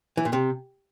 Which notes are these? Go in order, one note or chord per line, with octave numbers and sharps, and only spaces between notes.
E3
A#2
C3